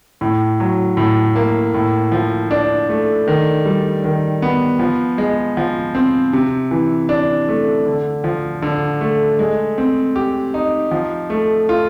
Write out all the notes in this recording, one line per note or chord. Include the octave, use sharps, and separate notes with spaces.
A2
F#3
A2
A#3
A2
F3
D4
A3
D#3
G3
D#3
B3
F3
G#3
F3
C4
C3
E3
D4
A3
D3
F3
D3
A3
G#3
C4
G4
D#4
F3
A3
F4